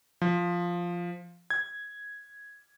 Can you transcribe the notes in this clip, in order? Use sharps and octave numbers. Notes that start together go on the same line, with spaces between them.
F3
G#6